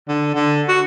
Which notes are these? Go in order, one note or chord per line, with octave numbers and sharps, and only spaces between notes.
D3
D3
F#4